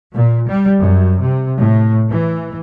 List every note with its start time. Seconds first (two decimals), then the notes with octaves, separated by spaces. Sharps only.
0.13 A#2
0.48 G3
0.80 F#2
1.21 C3
1.60 A2
2.09 E3